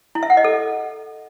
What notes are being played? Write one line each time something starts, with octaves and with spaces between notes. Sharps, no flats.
E4
E5
F#5
D#5
A4